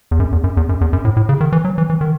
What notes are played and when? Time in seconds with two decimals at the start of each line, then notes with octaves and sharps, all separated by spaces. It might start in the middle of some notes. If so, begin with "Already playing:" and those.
0.11 E2
0.20 F#2
0.32 E2
0.44 F#2
0.57 E2
0.69 F#2
0.81 E2
0.93 F#2
1.05 A2
1.17 A2
1.29 C#3
1.41 D#3
1.52 E3
1.65 F#3
1.78 E3
1.90 E3
2.01 D#3